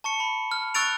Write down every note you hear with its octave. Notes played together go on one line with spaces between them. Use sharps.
A5 C#6 C#7
B5
F6
C#6 E6 F#6 A6 D7 F7